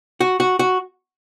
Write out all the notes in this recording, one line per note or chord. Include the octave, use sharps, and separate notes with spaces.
F#4
F#4
F#4